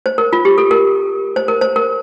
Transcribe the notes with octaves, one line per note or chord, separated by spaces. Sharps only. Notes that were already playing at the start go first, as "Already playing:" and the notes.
C5
A#4
F4
G4
A4
A#4
C5
A#4
C5
A#4